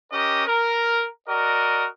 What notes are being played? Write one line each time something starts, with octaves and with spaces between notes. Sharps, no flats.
C#4 G4 A#4 D#5
A#4
F#4 A#4 D5 D#5